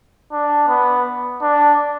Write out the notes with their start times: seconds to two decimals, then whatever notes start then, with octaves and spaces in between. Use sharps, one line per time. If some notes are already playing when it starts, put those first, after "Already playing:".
0.32 D4
0.68 B3
1.42 D4